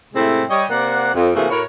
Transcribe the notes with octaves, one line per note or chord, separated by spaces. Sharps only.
A2 C3 G#3 A3 C4 E4
G3 G4 C#5 D#5
C3 A#3 D5 F#5
F2
C3 E3 A3 A#3 F#4 G#4
A2 E4 F#4 A#4 C#5